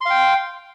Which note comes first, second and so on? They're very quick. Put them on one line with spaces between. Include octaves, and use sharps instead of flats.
C6 F5 G5